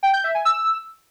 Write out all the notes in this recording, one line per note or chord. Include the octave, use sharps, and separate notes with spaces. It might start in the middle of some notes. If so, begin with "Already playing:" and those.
G5
G6
E5
G#5
E6